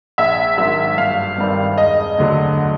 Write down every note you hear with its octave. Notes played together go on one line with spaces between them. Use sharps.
A#1 E5
G#2 D#3 F#3 E5
G1 F5
G2 D#3 G3 C4
E1 D#5
D2 D3 F#3